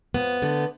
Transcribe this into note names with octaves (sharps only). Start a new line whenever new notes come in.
F2 B3
D3 A3